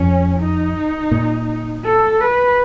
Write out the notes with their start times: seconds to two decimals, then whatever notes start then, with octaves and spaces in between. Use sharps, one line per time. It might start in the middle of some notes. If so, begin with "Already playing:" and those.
Already playing: F2 C#4
0.39 D#4
1.11 A#2
1.85 A4
2.21 B4